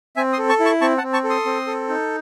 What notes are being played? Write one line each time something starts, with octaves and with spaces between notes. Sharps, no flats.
C4 E5 G#5
C6 D#6
A4
A5 C#6
E4
A5 C#6
C4 A5 C#6
F#5 A5
C4
A5 C#6
A4
C6 D#6
C4
A4
D#4